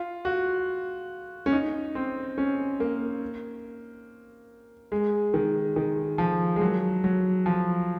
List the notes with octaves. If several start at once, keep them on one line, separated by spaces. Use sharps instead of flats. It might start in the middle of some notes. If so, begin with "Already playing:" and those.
Already playing: F4
F#4
C#4
D#4
C4
C#4
A#3
G#3
D#3
D#3
F3
G#3
F#3
F#3
F3